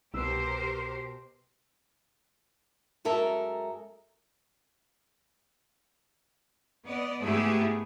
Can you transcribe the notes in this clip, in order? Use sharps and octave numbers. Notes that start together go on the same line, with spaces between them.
C2 B2 G4 A#4 C5 E6
F#2 G#3 A4 A#4 E5 A#5
B3 D5 D#5
G#2 A3 B3 E4 G4 G#4